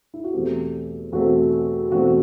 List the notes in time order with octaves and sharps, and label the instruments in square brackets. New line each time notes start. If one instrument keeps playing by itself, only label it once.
[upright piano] E4
F#4
E2 B2 A3 C4 G4
E2 B2 A3 C4 F#4
E2 B2 A3 C4 F#4